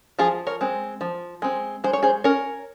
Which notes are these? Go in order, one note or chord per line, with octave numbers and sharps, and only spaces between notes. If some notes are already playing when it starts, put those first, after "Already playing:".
F3 F4 G#4
A#4 C#5
G#3 C4
F3
G#3 C4
G#3 C5
C#5
G#4 C5
C#4 A#4 C#5